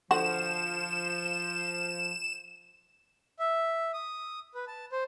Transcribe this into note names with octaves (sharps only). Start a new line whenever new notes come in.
D3 F3 F#4 F#5 E7
E5
D#6
B4
A5
C5